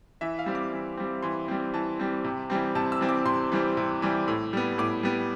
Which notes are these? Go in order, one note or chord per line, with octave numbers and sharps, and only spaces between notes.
E3 E5
F5
G3 C4
D6
E3
G3 C4
E3 C6
G3 C4
E3 A5
G3 C4
C3
E3 G3 C4
C3 A5
E6
E3 G3 C4
D6
C3 C6
E3 G3 C4
C3
E3 G3 C4
A2
G3 B3
A2 D6
G3 B3